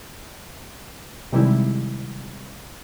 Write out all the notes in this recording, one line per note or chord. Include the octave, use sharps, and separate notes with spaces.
C3 D#3 G3 G#3 E4